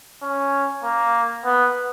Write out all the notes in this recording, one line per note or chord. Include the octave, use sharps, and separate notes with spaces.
C#4
A#3
B3